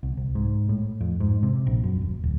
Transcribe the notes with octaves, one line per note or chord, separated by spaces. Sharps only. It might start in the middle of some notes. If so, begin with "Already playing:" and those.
C2
C2
G#2
A2
F2
G#2
C3
A#1
F#2
D#1
D1